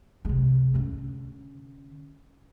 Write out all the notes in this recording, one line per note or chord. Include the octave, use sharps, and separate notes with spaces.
C3 G#3
D3 C#4